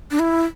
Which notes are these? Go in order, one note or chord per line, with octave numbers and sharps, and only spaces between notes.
D4
E4